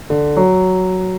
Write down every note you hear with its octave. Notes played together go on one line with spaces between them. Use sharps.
D3
F#3